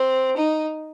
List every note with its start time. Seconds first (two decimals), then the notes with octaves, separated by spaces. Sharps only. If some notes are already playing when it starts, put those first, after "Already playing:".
Already playing: C4
0.37 D#4